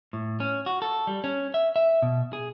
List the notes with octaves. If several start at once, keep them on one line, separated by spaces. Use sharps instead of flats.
A2
C#4
F#4
A4
G3
C#4
E5
E5
B2
G#4